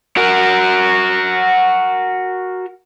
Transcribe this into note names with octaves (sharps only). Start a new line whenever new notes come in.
F#4 A#4